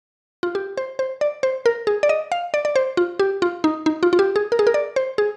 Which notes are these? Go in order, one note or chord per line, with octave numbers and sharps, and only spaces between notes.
F4
G4
C5
C5
D5
C5
A#4
G#4
D5
D#5
F5
D5
D5
C5
F4
G4
F4
D#4
D#4
F4
F4
G4
G#4
A#4
G#4
A#4
D5
C5
G#4